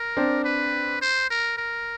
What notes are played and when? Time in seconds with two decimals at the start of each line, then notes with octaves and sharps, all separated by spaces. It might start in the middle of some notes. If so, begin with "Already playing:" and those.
Already playing: A#4
0.17 C4 D4
0.44 B4
1.02 C5
1.30 A#4
1.57 A#4